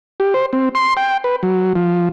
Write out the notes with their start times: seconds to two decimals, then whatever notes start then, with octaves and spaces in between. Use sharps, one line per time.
0.20 G4
0.34 C5
0.53 C4
0.75 C6
0.97 G5
1.24 B4
1.43 F#3
1.75 F3